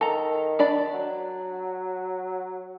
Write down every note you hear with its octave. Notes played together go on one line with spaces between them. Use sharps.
D#3 A4 A#5
D4 D5 B5
F#3